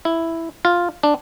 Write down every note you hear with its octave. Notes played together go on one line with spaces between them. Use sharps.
E4
F4
D4